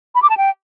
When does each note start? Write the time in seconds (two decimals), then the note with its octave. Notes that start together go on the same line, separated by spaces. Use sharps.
0.15 B5
0.22 D6
0.30 A5
0.37 G5